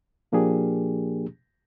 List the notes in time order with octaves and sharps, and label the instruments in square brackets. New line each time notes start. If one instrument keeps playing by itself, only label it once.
[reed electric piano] A#2 F3 A#3 D4 G4 G#4